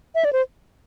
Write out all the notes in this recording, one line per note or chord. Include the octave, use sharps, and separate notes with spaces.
E5
D5
C5